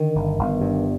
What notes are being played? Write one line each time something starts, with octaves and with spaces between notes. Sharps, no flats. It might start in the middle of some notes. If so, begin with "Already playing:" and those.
Already playing: D3 D#3
G1
G1
G2